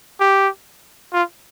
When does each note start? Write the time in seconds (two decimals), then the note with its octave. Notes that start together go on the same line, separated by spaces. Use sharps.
0.20 G4
1.13 F4